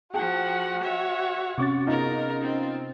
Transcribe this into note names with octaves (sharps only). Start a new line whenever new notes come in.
F3 F#4 G#4 F#5 G5 A5
C#5 E5
C3 C#4 C#6 D6 A6
B3 D#4 F4 G#4 A#4
C4